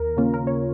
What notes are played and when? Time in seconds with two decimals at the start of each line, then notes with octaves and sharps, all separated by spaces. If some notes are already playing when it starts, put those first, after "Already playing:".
Already playing: D#2 A#4
0.17 C#3 A#3 C#4 F4
0.34 A#4
0.47 C#5